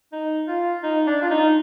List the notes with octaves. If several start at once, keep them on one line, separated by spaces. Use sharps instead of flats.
D#4
F4
D#4
D4
F4
D#4